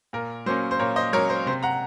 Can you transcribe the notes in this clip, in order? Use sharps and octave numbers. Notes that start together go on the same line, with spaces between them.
A#2 A#4
F#3 A#3 C#4 C5
C5
A#2 A#4 C#5
C5 D#5
F#3 A#3 C#4 A#4 C#5
C5
C3 C5
F#5 A#5